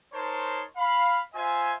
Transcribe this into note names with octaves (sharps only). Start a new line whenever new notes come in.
D#4 A#4 C5 C#5 A5 C6
F5 B5
F4 C5 E5 G#5